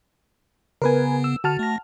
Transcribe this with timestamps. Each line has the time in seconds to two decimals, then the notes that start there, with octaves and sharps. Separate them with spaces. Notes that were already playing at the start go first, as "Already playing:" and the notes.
0.82 C#3 B3 A#4 B4 G#5
1.24 E6
1.44 D3 F#4 A5 F6
1.59 A3 A#6